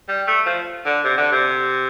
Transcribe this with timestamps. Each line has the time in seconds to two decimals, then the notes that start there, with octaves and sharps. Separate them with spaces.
0.08 G3
0.27 A3
0.47 F3
0.85 D3
1.05 C3
1.18 D3
1.32 C3